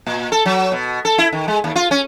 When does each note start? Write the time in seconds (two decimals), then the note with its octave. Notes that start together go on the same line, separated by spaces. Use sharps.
0.07 A#2
0.32 A4
0.46 F#3
0.72 B2
1.05 A4
1.18 E4
1.32 D#3
1.48 G#3
1.64 D#2
1.76 F4
1.91 C#4